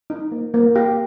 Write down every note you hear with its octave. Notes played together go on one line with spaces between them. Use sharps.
D#4
A#3
A#3
G4 F5